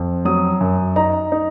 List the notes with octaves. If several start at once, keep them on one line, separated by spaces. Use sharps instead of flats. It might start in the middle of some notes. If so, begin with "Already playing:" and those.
Already playing: F2
F#3 D#6
F#2
D#4 A#5
D#4